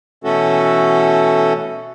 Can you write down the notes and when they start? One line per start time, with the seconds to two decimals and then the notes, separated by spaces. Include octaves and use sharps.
0.24 B2 E3 A3 C#4 F#4 A4